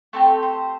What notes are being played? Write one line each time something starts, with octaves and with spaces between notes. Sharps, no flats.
A3 C4 G4 A4
C5